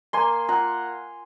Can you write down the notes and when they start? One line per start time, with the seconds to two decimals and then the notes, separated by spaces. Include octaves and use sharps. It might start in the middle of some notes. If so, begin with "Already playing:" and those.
0.13 A#3 G#5 C6
0.48 F4 F#5 A#5